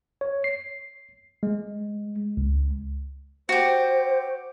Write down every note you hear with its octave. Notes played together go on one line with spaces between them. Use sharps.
C#5
C7
G#3
C#2
F#4 G4 C5